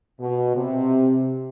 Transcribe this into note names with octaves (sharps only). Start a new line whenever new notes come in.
B2
C3